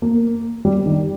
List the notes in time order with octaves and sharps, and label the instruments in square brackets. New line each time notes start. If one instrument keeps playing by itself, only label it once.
[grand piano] A#3
G3
D#3